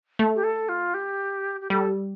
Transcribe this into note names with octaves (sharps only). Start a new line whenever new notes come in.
A3
G4
A4
F4
G4
G4
G3 A4